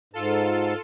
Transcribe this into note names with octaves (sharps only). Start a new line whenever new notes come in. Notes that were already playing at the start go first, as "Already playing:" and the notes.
G#2 F4 A4